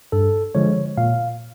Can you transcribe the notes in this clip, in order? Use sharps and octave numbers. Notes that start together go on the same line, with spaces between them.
G2 A4
D3 F3 G#3 C#5
A#2 F5